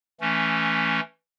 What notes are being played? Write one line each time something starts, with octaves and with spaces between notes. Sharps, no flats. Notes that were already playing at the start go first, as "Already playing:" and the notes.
E3 A3 C#4